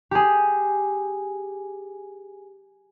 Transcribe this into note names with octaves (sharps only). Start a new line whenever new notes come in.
G4 G#4